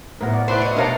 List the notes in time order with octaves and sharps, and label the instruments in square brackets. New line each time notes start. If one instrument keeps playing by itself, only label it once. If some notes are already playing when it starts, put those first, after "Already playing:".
[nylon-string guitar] A2 F#5 [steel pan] B3 A#4
[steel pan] D5
[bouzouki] A3 D4 C5 [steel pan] E4 B4
[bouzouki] F#4 D#5
[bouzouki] B2 A3 [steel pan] D4 F5 A#5 [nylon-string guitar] A#4 C#5